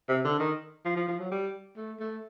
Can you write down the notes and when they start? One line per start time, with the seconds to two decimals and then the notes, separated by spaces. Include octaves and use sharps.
0.09 C3
0.25 D3
0.40 D#3
0.85 F3
0.97 F3
1.08 F3
1.20 F#3
1.31 G3
1.77 A3
2.00 A3